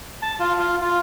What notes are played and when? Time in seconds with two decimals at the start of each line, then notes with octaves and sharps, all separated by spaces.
0.22 A5
0.40 F4
0.59 F4
0.81 F4